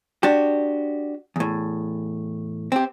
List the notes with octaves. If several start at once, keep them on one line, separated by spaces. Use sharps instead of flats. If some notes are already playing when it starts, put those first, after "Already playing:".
D4 F#4 G4
E2 A2
C4 G4